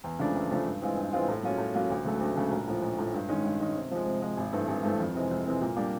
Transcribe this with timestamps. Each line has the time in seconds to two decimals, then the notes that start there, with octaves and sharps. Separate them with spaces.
0.04 E2
0.19 C#3 F3 A3 D4
0.35 E2
0.51 C#3 F3 A3 D4
0.65 G2
0.82 E3 G#3 C4 F4
0.97 G2
1.13 E3 G#3 C4 F4
1.28 A2
1.43 F#3 A#3 C#4 F4
1.58 A2
1.74 F#3 A#3 C#4 F4
1.90 D2
2.05 C#3 F#3 A3
2.20 D2
2.36 C#3 F#3 A3
2.51 A#1
2.67 A2 F3
2.82 A#1
2.98 A2 F3
3.14 G2
3.28 D#3 G#3 C#4
3.44 G2
3.60 D#3 G#3 C#4
3.76 C3
3.91 F3 G#3
4.06 C3
4.22 F3 G#3
4.37 G#1
4.53 G2 E3 A3 C4
4.68 G#1
4.83 G2 E3 A3 C4
5.00 F2
5.15 C3 E3 G#3 C4
5.31 F2
5.45 C3 E3 G#3 C4
5.61 A#2
5.76 G3 A#3 D4